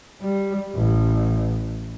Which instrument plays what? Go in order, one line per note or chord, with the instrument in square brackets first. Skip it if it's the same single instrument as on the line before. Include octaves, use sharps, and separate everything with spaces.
[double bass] G3
A1